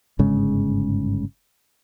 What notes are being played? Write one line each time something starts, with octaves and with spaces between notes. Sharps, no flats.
G1 G#2 C#3 G#3